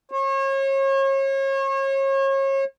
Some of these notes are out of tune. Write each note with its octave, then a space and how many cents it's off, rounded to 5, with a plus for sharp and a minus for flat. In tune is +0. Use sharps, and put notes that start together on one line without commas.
C#5 -35